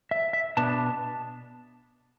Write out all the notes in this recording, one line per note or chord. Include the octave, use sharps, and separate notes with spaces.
E5
E5
B2 B3 D4 A5